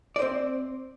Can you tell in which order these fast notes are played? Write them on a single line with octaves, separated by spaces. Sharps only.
D5 C5 C4